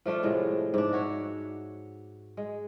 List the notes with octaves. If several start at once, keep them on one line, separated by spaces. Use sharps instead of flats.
F3 A3 D4 F4
A2 C3 G#3
G#2 D4
F#4 C#5 E5
G#3